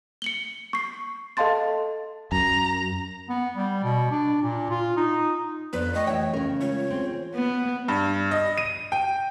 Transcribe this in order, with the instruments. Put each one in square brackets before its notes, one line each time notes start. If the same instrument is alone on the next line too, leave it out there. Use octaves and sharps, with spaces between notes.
[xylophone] C#7 F#7 G7
C#6 C7
A4 D#5 F5 A5 C6 A6
[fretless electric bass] F#2 [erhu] A#5
[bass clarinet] B3
G3
B2
D4
A#2
F4
D#4
[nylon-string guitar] F2 F3 D4 [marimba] B3 D5 [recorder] B4
[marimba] A3 G5 C#6 [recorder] D#5
[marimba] E3 [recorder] C#5 [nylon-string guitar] E5 G5
[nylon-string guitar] C#3 A#4 [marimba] C#4
[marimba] G#3 F4 [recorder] C#5
[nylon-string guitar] C4 G#4
[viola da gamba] B3
[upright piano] G2
D#5
D#7
G5